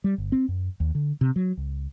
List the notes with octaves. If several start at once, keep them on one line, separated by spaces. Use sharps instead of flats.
G3
G1
C4
F#2
D#2
D3
C3
F#3
C#2